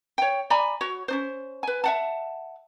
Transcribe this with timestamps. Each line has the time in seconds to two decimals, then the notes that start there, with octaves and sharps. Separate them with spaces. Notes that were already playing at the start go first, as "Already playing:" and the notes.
0.18 C#5 G5
0.50 D5 G#5 A#5 B5
0.81 F#4 C#5
1.08 C#4 D4 C5
1.63 B4 G#5
1.84 E5 F#5 A5